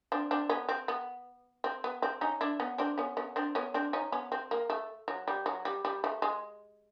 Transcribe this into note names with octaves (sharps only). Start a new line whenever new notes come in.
C4 D4
C4 D4
B3 C#4
C4
B3
C4
B3
C4
C#4 D#4
D4 E4
B3 C#4
C4 D4
B3 C#4
B3 C#4
C4 D4
B3 C#4
C4 D4
C#4 D#4
B3 C#4
C4
A#3
A3
F#3
G3
F#3
G3
G3
A3
G#3